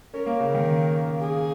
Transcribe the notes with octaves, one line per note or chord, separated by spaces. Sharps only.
C#4 A#4
A#3
C#3
D#3
G#4